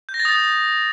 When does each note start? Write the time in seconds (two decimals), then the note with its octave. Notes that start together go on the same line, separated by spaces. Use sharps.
0.09 G6
0.14 A#6
0.20 A6
0.25 D#6
0.31 G6